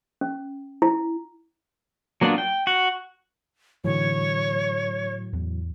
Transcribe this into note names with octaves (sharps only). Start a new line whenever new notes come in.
C#4
E4
F#3 A#3 B3 D4 F4
G5
F#4
A2 D3 E3 F#3 C#5
E2